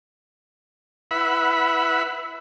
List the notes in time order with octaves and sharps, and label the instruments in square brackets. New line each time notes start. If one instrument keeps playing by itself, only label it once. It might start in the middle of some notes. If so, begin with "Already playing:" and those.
[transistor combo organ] E4 B4 E5 F#5 B5